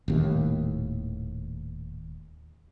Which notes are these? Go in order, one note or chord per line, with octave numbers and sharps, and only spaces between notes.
D#1 D#2 A2